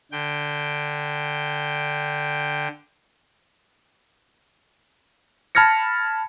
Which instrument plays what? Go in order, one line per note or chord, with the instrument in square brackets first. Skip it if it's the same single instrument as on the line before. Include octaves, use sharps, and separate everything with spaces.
[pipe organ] D3 G5
[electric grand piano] A5 B5 F6 G#6 A#6 C#7